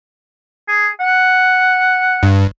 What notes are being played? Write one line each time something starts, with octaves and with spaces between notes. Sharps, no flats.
G#4
F#5
G2